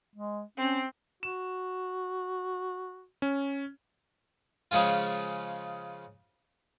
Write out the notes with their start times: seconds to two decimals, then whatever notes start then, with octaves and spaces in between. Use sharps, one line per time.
0.15 G#3
0.58 C4 C#4
1.23 F#4 E7
3.22 C#4
4.71 C#3 F3 G#3 C#4 F4